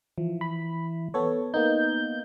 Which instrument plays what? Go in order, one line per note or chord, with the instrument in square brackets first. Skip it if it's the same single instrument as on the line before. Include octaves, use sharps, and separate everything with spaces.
[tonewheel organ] E3 [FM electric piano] F3
[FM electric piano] B5
B3 A4 C#5
[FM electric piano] A#3 B3 D#4 [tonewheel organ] G6